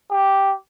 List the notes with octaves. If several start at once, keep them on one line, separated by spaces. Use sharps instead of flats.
G4